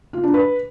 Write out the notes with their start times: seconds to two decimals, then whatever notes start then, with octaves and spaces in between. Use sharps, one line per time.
0.13 F4
0.24 D4
0.34 B4